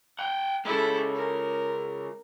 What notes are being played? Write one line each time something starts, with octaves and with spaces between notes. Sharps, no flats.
F#5 G5
C#3 G#3 E4 A4
A#4